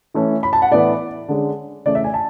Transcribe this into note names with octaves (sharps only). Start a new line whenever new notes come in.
E3 A3 C#4
B5
A5
F#5
A2 E3 B3 D5
D3 G#3 C#4
C#3 E3 A3 C#4 D5
E5
G#5
A5